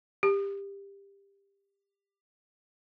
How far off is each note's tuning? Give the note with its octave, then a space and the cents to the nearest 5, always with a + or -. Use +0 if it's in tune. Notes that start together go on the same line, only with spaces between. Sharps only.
G4 +20